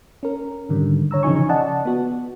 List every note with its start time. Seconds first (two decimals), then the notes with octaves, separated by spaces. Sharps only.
0.23 C#4 A#4
0.69 G#2 D3 D#3 G3
1.11 D3 C#5 A#5 E6
1.23 C#3 E3 F3 D#4 G#5 C#6
1.49 D5 D#5 F#5 A5
1.85 B3 F#4